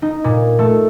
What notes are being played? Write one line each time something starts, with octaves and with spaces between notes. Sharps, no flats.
D#4
A#2
A3